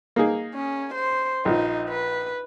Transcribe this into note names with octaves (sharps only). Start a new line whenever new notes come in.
A#3 D#4 G#4
C#4
C5
A#1 F3 D#4
B4